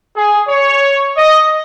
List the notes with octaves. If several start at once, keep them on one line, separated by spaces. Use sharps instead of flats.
G#4
C#5
D#5